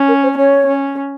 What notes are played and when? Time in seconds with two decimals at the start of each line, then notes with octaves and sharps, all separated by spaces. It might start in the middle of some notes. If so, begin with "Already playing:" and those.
Already playing: C#4
0.08 A#4
0.23 C5
0.38 C#4 C#5
0.67 C#4